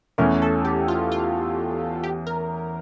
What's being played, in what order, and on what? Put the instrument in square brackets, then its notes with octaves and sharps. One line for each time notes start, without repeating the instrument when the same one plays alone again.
[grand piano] E2 E3 A3 C#4 [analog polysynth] A#4
[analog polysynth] A4
G4
F4
F4
G4
A#4